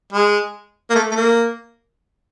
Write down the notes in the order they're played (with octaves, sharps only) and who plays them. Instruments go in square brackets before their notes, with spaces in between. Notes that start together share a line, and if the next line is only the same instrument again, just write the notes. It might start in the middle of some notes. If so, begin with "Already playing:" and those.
[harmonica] G#3
A#3
A3
A3
A#3